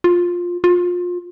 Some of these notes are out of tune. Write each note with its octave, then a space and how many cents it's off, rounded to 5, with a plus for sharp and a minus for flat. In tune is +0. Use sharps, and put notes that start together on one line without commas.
F4 +10
F4 +25